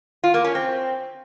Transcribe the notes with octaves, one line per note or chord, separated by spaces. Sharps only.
F4
A#3
C#4
C4